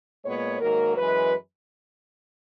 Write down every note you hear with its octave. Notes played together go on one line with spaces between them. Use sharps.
A#2 G#3 B3 C#5
G#2 D#3 F#3 A#3 A#4
F#2 E3 G#3 B4